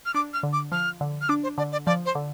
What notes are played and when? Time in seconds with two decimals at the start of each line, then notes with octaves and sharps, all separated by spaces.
0.06 F6
0.14 D4 D6
0.33 F6
0.43 D3
0.53 D6
0.72 F3 F6
1.01 D3
1.21 F6
1.29 D4 D6
1.43 C5
1.58 D3 D5
1.72 D5
1.86 F3 D5
2.06 C5
2.15 D3